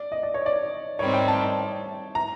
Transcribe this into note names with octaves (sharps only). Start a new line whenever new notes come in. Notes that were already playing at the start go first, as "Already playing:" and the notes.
Already playing: D5
D#5
D5
C#5
D5
G#2 D#3 G3 C4 C#5
G5
A5
A#5